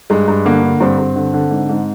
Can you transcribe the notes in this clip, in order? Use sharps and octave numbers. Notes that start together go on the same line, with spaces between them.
G2 G#3
G2
D3 A#3
D3
G2 C4
G2
D3
D3
G#2
G#2